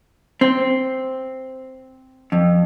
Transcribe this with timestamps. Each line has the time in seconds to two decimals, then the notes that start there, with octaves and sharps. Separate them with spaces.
0.41 C4
2.32 F2